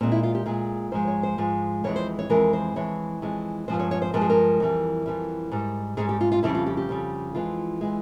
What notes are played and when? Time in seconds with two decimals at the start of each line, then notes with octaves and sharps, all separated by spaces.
0.01 A#2 G#3 C4
0.12 E4
0.23 F4
0.35 G4
0.46 A#2 G#3 G#4
0.92 G#2 F3 G#3 C5
1.07 C#5
1.23 C5
1.38 G#2 F3 G#3
1.84 F2 E3 G#3 C#5
1.96 C5
2.19 C#5
2.30 F2 E3 G#3 A#4
2.53 C5
2.76 F2 E3 G#3 C#5
3.22 F2 E3 G#3
3.68 G2 F3 G#3 C5
3.79 C#5
3.91 C#5
4.02 C5
4.14 G2 F3 G#3 A#4
4.21 G#4
4.30 A#4
4.60 F2 E3 G3
5.06 F2 E3 G3
5.51 G#2 G3
5.97 G#2 G3 G#4
6.09 G4
6.21 F4
6.32 F4
6.43 F2 C#3 G3 E4
6.55 F4
6.66 G4
6.77 G4
6.89 F2 C#3 G3
7.35 F2 E3 G#3 F4
7.81 E3 G#3